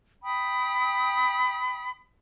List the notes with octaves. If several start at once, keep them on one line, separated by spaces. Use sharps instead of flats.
G5 B5 D#6